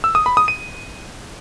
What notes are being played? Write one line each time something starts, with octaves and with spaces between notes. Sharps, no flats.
E6
D#6
B5
D#6
D#7